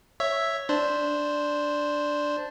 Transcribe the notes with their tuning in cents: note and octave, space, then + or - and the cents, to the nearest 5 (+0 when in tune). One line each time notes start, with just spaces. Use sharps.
C#5 +0 E5 +0
D4 +0 C5 +0